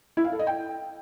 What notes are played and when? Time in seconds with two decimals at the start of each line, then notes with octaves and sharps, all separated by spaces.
0.17 E4
0.24 F5
0.32 A4
0.39 D#5
0.47 G5